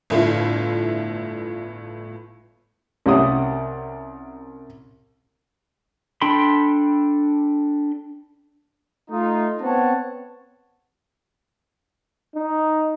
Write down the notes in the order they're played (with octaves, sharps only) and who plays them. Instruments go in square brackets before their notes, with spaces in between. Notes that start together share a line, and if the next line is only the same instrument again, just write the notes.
[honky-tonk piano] G1 A2 E4 F4
[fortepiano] C2 C#4 G4 E5 F#5 D#6
[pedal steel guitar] D4 A4 G5 B5 C6
[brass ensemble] A3 D#4 F4
B3 C4 C#5 F#5 A5
[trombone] D#4